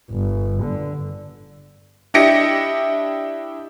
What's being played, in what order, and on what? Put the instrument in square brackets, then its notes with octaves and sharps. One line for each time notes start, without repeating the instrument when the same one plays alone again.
[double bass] G1
D3
[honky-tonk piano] D4 E4 G4 D#5 A#6 C#7